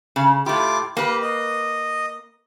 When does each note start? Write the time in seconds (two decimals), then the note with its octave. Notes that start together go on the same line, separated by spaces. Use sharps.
0.16 C#3
0.46 A2 E4 F4 G4 D6
0.97 A#3 G4 B4
1.22 D#5